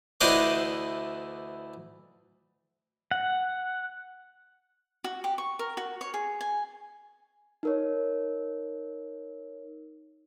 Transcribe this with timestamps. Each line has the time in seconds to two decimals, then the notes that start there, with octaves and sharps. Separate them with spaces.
0.21 D2 E3 D4 C5 D#5 D6
3.11 F#5
5.04 F#4
5.24 G4
5.38 C#6
5.59 A#4
5.77 F#4
6.01 C#5
6.14 G#4
6.41 G#5
7.63 D#4 A#4 C#5